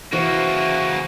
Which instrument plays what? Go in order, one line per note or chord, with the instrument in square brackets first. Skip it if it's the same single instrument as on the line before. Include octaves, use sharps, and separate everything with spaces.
[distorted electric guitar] C#3 A#3 [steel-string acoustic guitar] E3 E4 C5 [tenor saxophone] F#4